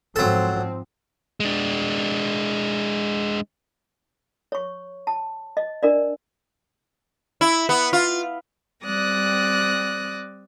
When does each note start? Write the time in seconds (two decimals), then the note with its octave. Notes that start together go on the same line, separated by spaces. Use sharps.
0.16 G#2 F3 F#3 C4 A4
1.40 G#3 D4
4.52 C#5 C#6
5.07 A5
5.57 D#5
5.83 D4 A#4 D5
7.41 E4
7.69 B3
7.93 F4
8.84 G3 C4 D5 D#6 F#6 A#6